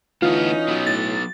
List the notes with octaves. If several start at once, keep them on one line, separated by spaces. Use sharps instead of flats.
D2 E3 B3 C#4 D#4 F4
F#3 B3
A2 A6